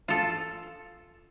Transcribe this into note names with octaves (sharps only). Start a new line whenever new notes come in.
F4 A4